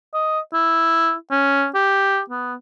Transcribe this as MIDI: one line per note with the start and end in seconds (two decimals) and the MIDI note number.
0.14 0.39 75
0.53 1.14 64
1.31 1.67 61
1.75 2.20 67
2.30 2.54 59